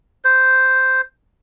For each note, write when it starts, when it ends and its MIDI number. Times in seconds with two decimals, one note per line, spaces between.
0.24 1.01 72